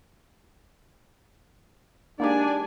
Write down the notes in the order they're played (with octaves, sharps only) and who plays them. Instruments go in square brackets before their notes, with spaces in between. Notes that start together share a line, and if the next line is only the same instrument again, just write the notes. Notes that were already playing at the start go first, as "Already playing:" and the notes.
[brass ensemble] G#3 D4 [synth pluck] A#3 D#4 G4 [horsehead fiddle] D5 G#5